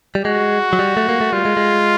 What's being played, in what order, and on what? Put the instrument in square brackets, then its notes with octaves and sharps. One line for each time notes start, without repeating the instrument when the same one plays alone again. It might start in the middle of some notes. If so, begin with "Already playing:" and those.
[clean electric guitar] G3
[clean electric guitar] G#3 [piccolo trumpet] F#4
[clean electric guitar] F#3
G3
A3
A#3
A3
[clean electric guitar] G3 [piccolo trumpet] F4
[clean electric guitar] G#3
G#3